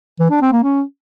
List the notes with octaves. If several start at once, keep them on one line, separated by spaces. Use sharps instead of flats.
E3
D4
C4
A#3
C#4